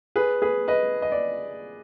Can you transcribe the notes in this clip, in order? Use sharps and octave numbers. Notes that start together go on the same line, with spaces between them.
G#4 B4
G#4 B4
B4 D#5
D#5
D5